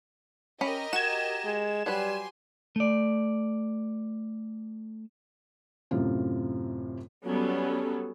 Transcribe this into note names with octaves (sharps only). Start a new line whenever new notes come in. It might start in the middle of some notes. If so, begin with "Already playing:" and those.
C#4 G4 A#4 D#5 B5
F#4 G#6 E7
G#3
F#3 G3 G4 B4 G#5 C6
A3 D5
F#2 A2 C3 F4
F#3 G3 B3 C#4 A4